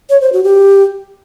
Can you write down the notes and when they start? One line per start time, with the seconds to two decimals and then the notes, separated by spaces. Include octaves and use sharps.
0.10 C#5
0.21 C5
0.33 F#4
0.44 G4